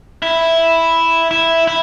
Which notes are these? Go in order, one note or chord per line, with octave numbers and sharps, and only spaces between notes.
E4
E4
E4